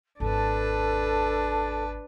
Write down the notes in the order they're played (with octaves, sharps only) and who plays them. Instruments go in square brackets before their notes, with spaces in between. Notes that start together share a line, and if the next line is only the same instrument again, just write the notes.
[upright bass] G#1 E2 [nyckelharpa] D4 B4 [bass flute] A4 [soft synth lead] A5